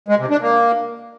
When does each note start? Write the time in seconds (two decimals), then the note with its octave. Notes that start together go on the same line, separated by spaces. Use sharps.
0.08 G#3
0.19 C3
0.30 D4
0.41 A#3